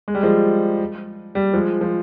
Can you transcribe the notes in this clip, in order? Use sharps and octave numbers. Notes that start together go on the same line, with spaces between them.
G#3
G3
F3 G#3
G3
F3 G#3
F3